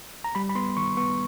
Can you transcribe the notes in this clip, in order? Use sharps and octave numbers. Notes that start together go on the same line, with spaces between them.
A#5
G3 B5
B5
B3 C6
D#3 C#6
B3 C#6